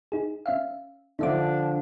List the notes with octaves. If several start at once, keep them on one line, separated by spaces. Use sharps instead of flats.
D#4 G#4
C#4 E5 F5
D3 F3 D4 D#4 E5 D6